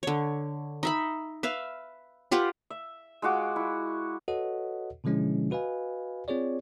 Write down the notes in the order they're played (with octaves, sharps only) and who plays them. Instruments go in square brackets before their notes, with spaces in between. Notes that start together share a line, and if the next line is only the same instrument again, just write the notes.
[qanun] D3 C#5
D#4 E5 B5
B4 E5 F5
F4 G4 B4 F#5
[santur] E5
G#3 F4 F#4 D6
E4
[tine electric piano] F#4 A4 B4 C#5 D#5 F#5
B2 D3 F3 G#3 C#4 E4
F#4 B4 D#5 F5 G#5
C4 F4 G#4 C#5 D5